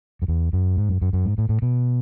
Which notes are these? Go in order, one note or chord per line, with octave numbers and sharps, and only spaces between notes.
F#2
E2
F#2
G#2
F#2
F#2
F#2
G#2
A2
A2
B2